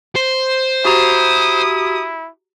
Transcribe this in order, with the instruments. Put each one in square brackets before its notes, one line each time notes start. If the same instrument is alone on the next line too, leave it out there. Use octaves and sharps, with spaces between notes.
[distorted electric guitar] C5
[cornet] E4 [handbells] F#4 G4 A#5 [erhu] D#6